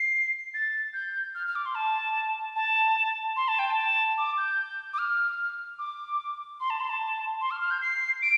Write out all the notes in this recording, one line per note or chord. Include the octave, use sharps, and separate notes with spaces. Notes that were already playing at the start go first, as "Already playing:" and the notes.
Already playing: C7
A6
G6
F6
F6
D6
C6
A5
A5
C6
A5
G5
A5
D6
G6
D6
F6
D6
C6
A5
C6
A5
C6
F6
F6
G6
C7
D7